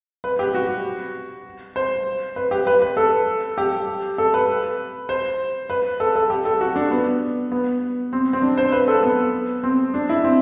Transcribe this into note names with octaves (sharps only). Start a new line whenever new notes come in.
B4
G4
F#4
C5
B4
G4
B4
B4
A4
G4
A4
B4
C5
B4
A4
A4
G4
A4
F#4
D4
B3
B3
C4
C4
D4
C5
B4
A4
B3
C4
D4
E4
C4